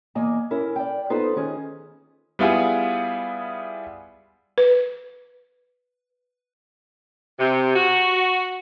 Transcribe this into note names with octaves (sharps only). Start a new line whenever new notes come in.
E2 A#3 D#5 G#5
C#4 E4 A#4
D5 G5
B3 D#4 F4 A4 B4 C5
D#3 C#4 G#4
G3 B3 E4 F4 G#4 F#5
B4
C3
F#4